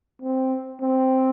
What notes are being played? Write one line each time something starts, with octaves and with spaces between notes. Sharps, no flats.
C4
C4